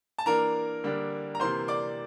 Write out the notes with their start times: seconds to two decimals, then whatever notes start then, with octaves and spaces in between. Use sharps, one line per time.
0.18 A5
0.26 E3 A#3 D4 A#4 A#5
0.84 D3 G3 A#3 D4
1.35 A#5
1.40 C3 E3 A#3 C5 C6
1.68 D5 D6